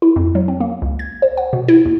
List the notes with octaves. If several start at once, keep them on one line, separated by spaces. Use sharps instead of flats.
E4
F2
F#3
C4
A#3
C#2
G#6
C5
F#5
B2
E4
D#2